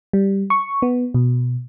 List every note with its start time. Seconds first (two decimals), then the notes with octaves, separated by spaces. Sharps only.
0.13 G3
0.50 C#6
0.82 B3
1.14 B2